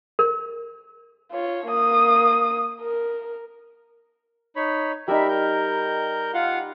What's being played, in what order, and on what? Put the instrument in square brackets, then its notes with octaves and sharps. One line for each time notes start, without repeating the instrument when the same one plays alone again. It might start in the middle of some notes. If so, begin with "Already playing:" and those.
[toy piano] A#4
[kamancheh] F4 C#5
A#3 D#6
A#4
[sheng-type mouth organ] D#4 C#5 B5
[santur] G3 D#4 [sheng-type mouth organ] A#4 E5 B5
[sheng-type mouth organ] A#4 G6
F4 F5 F#5